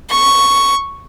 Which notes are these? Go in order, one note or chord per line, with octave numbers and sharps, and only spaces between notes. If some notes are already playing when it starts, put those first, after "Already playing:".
C#6